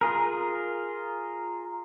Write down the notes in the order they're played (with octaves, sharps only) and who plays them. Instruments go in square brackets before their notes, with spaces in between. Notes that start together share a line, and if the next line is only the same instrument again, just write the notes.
[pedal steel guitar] F4 G#4 A#4